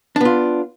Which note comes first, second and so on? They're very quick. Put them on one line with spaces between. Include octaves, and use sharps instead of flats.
D4 B3 F4